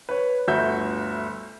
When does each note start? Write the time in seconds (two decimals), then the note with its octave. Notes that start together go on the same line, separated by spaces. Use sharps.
0.09 B4 C#5
0.48 G1 D2 F#4 E5 G6